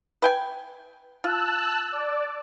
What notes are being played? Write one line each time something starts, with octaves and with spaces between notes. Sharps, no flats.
B4 G5 G#5
F4 A5 E6 F#6
D5